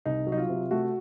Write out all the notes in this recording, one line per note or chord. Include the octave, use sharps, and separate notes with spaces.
C2 D#4
F#3
D#4
F4
C3
A3 F#4